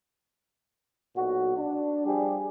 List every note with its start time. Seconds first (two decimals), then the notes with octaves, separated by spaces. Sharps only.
1.15 B1 A#2 F#4
1.56 D4
2.05 F3 G3 D4 G4 G#4